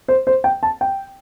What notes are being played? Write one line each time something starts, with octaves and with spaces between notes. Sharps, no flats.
C5
C5
G5
A5
G5